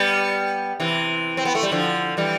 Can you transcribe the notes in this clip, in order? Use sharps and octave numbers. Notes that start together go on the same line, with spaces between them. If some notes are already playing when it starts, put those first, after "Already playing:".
Already playing: G3 B3
C3 E3
C4
B3
A3
G3
D3 F3
E3 G3